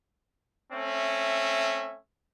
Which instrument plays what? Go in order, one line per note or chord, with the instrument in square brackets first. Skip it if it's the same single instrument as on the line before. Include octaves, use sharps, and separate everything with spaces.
[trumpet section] A3 C4 C#4 E5